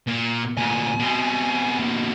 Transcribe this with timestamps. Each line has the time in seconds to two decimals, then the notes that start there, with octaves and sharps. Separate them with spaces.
0.08 A#2
0.57 D2 A#2 G#5
0.99 B2 C4
1.79 D3 A#3